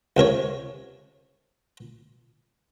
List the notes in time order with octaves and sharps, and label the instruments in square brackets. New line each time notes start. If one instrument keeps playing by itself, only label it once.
[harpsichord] C#2 C3 A#4 C#5